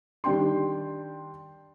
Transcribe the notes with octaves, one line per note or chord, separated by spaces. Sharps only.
D#3 G3 D4 G5 C6